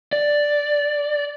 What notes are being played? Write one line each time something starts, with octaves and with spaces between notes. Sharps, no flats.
D5